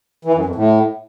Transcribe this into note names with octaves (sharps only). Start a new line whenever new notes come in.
E3
F#2
F2
A2